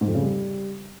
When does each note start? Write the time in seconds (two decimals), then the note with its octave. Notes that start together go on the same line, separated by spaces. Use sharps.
0.01 G#2
0.08 F2
0.15 C#3
0.22 G3